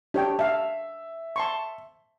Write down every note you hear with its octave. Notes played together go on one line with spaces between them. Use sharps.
D4 G4 C#5 G5
E5 F5 A5
A5 C6 C#6